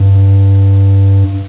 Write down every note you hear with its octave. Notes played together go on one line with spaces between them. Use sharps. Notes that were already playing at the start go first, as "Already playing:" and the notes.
Already playing: G2